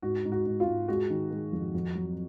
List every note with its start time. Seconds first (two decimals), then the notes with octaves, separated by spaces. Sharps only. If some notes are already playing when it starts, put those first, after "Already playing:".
0.02 G#2 F#4
0.25 G#2
0.32 F#4
0.46 G#2
0.60 F4
0.67 G#2
0.88 G#3 F#4
1.10 D#3
1.31 G#3
1.53 F2
1.75 F2
1.95 F#3